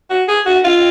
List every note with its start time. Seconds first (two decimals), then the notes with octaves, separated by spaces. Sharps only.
0.10 F#4
0.28 G#4
0.46 F#4
0.64 F4